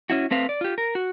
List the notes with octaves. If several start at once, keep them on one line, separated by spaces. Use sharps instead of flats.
C#4 E4 F#4
A3 C4 B4 F5
D5
F4 G4
A#4
F#4